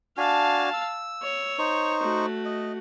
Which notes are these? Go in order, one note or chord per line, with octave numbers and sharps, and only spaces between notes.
D4 F#4 F5 G#5 A5
E6
C#5
D#4 C5 C#6
A3 F#4
D#5